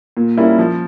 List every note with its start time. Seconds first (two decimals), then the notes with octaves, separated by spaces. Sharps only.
0.17 A#2
0.37 G3 A#3 C#4 E4
0.59 F3